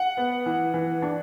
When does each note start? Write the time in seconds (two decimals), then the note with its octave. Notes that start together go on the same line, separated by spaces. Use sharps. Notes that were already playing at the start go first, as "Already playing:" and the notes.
Already playing: F#5
0.17 B3
0.46 E3
0.74 E3
1.02 D4